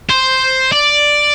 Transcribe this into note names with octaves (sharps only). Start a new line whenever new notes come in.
C5
D5